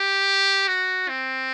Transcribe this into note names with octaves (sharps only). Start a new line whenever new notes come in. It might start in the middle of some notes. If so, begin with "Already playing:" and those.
Already playing: G4
F#4
C4